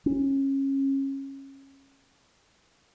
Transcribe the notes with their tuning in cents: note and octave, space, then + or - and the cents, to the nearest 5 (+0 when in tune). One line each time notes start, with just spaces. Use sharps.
C#4 -25